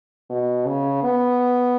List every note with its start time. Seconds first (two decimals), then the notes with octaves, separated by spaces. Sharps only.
0.30 B2
0.67 C#3
1.04 B3